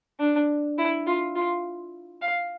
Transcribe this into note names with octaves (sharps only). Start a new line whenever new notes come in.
D4
E4
F4
F4
F5